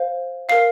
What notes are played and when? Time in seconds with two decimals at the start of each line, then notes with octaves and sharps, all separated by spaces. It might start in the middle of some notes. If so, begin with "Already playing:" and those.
Already playing: C5 F5
0.49 A#4 F5 C7